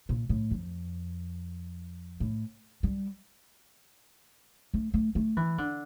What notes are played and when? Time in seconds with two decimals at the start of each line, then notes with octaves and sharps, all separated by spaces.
0.09 A#2
0.29 A2
0.51 F2
2.20 A2
2.83 G3
4.74 A3
4.94 A3
5.15 A3
5.37 E3
5.58 D3